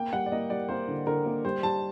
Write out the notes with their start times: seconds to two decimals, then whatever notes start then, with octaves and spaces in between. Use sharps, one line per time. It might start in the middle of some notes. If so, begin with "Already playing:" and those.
Already playing: A#3 G5
0.13 G3 F#5
0.26 D5
0.32 A#3 D#5
0.50 G3 D5
0.69 A#3 C5
0.88 D3
1.07 D3 A#4
1.26 A#3
1.45 G3 C5
1.63 G3 A5